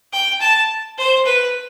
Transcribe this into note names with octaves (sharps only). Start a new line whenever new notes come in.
G5
A5
C5
B4